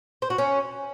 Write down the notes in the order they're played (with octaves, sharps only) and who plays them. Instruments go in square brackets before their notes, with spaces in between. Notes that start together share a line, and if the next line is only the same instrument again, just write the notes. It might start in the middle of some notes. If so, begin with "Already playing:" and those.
[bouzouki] C5
F#4
C#4